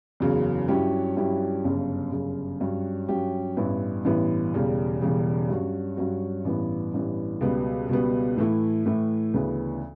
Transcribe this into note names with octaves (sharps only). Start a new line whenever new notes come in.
F#1 E2 C#3 F#3
G2 F#3 C#4 E4 G4
G2 F#3 C#4 E4 G4
G1 F#2 C#3
G1 F#2 C#3
G2 F#3 C#4 G4
G2 F#3 C#4 G4
A1 G2 E3 B3 E4
A1 G2 E3 B3 E4
E1 E2 C#3 G3
E1 E2 C#3 G3
G2 F#3 C#4 F#4
G2 F#3 C#4 F#4
A1 G2 E3 B3
A1 G2 E3 B3
C#2 B2 G3 B3
C#2 B2 G3 B3
A2 E3 A3 E4
A2 E3 A3 E4
D2 C#3 E3 B3